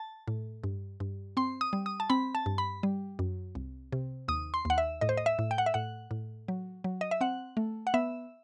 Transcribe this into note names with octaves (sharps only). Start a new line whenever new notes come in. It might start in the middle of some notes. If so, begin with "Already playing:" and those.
Already playing: A5
A2
G2
G2
C4 C6
D#6
G3
D#6
A5
C4 B5
A5
G2
B5
G3
F#2
C2
C3
D#2 D#6
C6
D#2 F#5
E5
A2 D#5
C5
D#5
E5
A2
G5
F#5
E5
A2 F#5
A2
F#3
F#3
D#5
E5
C4 F#5
A3
F#5
B3 E5